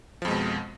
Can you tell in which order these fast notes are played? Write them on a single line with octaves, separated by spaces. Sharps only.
F3 F2 G#3 B2